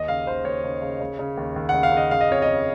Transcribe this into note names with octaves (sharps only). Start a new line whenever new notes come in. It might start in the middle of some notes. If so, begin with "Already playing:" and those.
Already playing: D#2 D#5
C#3 F5
D#2 C5
D#2 C#5
C#3
C#3
C#3
C#3
D#2
D#2
F#5
C#3
F5
C#3 D#5
C#3 F5
D#5
F2 C#5
D#5
C#3